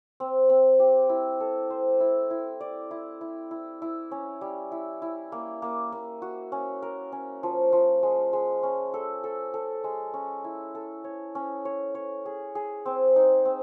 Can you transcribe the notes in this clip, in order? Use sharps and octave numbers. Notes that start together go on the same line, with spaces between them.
C4
C4
G4
E4
A4
C5
E4
E4
D5
E4
E4
E4
E4
C#4
G3
E4
E4
A#3
A#3
A#3
F#4
C#4
A#4
C#4
F3
F3
G#3
G#3
C#4
A4
A4
A4
G#3
C#4
E4
A4
C#5
C#4
C#5
C#5
G#4
G#4
C4
D#4
C4